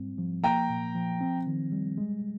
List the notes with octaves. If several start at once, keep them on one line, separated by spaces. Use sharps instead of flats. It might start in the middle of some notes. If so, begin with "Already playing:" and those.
Already playing: G#2 G3 C4
F3
A#3 G5 A#5
A#2
F3
C4
D#3
G3
G#3